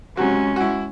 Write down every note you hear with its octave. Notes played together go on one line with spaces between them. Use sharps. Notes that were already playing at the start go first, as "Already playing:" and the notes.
C3 F#3 G#3 C#4 F#4
E4 F#4